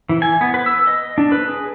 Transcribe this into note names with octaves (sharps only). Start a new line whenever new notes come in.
E3
G#5
B3
B4
E6
D#5
D4
B4
G#4